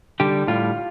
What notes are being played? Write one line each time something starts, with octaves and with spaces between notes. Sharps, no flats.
D3 G3 G4
A2 G3 F4